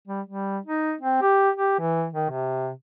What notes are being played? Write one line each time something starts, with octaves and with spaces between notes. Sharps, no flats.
G3
G3
D#4
C4
G4
G4
E3
D#3
C3